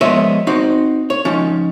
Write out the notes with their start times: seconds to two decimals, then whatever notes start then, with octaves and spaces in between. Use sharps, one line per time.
0.01 F3 G#3 B3 C#5 D#5 E5
0.47 C4 D#4 F#4 C5
1.10 C#5
1.25 F3 C#4 D#4